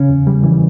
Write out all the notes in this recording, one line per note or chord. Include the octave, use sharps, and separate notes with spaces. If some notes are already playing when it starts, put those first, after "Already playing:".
Already playing: C#3 C#4
E2
G3
E3